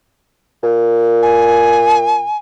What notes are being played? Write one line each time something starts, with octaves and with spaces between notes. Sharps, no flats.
A#2
G#5